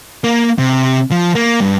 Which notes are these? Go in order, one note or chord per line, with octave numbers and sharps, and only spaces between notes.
A#3
C3
F3
A#3
G2